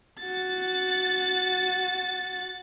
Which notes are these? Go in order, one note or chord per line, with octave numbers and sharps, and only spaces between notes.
F#4 A6